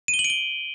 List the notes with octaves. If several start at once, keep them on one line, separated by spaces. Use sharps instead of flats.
D#7
G7
F#7
D7
G7